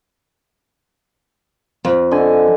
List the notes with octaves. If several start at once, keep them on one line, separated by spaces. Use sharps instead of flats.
F2
D3 D#5 G#5